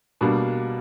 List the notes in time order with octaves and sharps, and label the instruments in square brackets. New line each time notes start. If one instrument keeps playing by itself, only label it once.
[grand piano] B2 G3 A#3 D4